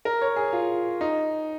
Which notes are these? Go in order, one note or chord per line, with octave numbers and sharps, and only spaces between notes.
A#4
C#5
G#4
F4
D#4